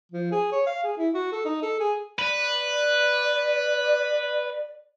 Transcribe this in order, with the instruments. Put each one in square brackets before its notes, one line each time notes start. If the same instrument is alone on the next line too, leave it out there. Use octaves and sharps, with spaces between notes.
[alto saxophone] F3
G#4
C#5
F5
G#4
E4
F#4
A4
D#4
A4
G#4
[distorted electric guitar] B4 [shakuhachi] D5